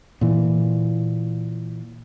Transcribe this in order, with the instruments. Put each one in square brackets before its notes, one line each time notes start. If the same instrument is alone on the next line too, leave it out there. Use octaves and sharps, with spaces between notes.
[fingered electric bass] A#2 E3